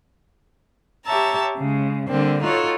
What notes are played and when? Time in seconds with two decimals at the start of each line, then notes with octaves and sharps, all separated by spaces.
1.06 G4 C#5 E5 A5 A#5
1.58 C#3 G#3
2.10 D3 G3 A#3 C4 D4
2.42 D#4 F4 F#4 A4 C#5